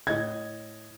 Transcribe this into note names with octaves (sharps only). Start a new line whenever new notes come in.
A2 D#5 G#6